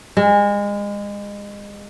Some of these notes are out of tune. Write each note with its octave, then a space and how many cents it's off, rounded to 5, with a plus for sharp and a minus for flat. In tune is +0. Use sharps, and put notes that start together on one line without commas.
G#3 -30